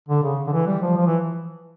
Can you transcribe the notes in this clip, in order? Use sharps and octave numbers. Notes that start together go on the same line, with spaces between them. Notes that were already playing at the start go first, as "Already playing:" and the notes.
D3
C#3
D3
E3
G3
F3
F3
E3